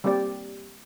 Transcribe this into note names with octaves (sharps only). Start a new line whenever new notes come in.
G3 A#3 C4 G4 D5